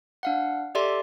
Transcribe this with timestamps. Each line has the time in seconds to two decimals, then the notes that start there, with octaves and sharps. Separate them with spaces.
0.23 D4 F5 F#5
0.75 G4 A4 D5 E5 C6